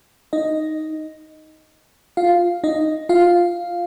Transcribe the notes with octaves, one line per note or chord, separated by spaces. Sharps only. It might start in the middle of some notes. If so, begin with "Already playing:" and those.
D#4 D#5
F4 F5
D#4 D#5
F4 F5